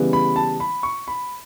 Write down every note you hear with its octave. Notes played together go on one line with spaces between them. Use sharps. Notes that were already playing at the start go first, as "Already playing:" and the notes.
Already playing: C#3 E3 G3 B3
B5
A5
B5
C#6
B5